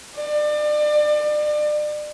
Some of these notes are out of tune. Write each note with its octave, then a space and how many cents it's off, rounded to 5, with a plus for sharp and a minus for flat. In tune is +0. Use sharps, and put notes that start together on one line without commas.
D5 +35